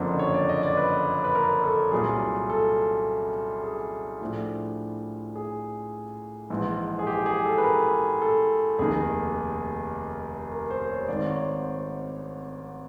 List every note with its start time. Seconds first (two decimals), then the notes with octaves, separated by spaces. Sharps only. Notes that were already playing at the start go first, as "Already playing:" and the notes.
Already playing: F#1 F2 D3 F3 A#3 C5
0.19 C#5
0.34 D5
0.49 D#5
0.63 D5
0.77 B4
1.24 B4
1.35 A#4
1.63 A4
1.92 C2 A#2 F#3 G#4
2.50 A4
3.64 G#4
4.21 A2 F3 A3 D4
5.35 G#4
6.50 A#1 G#2 E3
6.99 G#4
7.07 G4
7.26 G#4
7.46 A4
7.58 B4
7.64 A#4
8.22 A4
8.79 F1 D#2 D#3 G#4
10.52 A#4
10.70 C5
10.89 C#5
11.08 G#1 G#2 D#3 D5
11.27 C#5
11.46 C5